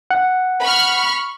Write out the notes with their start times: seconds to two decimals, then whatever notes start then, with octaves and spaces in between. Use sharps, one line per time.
0.11 F#5
0.62 B5 C#6 F6